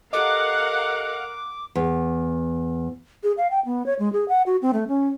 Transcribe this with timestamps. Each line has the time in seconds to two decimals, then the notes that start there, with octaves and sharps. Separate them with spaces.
0.13 G4 A4 A#4 D#5 F5 F#5 D6
1.75 E2
3.23 G#4
3.38 F5
3.51 G5
3.65 B3
3.86 C#5
3.99 G#3
4.13 G#4
4.29 F#5
4.46 F#4
4.62 C4
4.73 A3
4.88 C#4